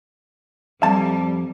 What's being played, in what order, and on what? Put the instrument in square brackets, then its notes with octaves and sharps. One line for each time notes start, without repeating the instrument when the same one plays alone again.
[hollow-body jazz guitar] F2 A5 [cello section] G3